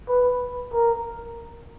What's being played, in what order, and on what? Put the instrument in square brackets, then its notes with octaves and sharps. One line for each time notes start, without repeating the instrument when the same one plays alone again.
[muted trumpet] B4
A#4